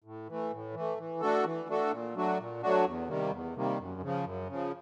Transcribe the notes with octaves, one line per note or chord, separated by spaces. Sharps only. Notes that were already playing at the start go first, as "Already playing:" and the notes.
A2
E3 A3
A2
E3
A3
E3
A3 D4 F#4 A4
E3
A3 D4 F#4 A4
A#2
F#3 A3 D4 F#4
A#2
F#3 A3 D4 F#4
E2
C3 D#3 G3 A#3
E2
C3 D#3 G3 A#3
F#2
C#3 F3
F#2
C#3 F3